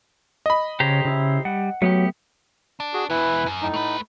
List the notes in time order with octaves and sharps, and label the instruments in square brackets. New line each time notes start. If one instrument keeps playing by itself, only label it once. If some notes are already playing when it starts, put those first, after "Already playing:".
[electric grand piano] D#5 B5
[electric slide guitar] C#3 C#5 [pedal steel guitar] G4 C5 A#5
[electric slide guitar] C#3 E4
[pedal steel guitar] G3 [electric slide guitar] F#5
[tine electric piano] F#3 [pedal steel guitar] A3 B3 G4
[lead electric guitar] D4
[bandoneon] F#4 G#4
[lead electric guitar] B2 E3 [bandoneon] E4 B4
[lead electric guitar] F#2
[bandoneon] A2 D#4
[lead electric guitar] A3 B4